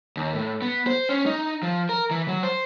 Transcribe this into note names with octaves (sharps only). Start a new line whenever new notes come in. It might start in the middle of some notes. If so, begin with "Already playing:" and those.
D#2
A2
B3
C5
C#4
D#4
F3
A#4
E3
F#3
C5